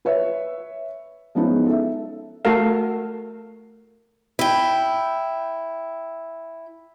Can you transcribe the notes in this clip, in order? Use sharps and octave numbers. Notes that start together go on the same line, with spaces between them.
B4 C#5 E5
F3 G#3 B3 C#4 D#4 E4
A4 E5
A3 F#4 A4 A#4 F5
E4 G5